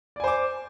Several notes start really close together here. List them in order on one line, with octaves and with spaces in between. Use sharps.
D5 G#5 C5 D6